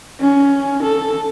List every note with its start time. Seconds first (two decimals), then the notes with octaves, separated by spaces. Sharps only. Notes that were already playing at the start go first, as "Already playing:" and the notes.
0.20 C#4
0.83 A4